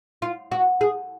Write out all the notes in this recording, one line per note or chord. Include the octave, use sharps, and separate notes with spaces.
F4
F#4
G#4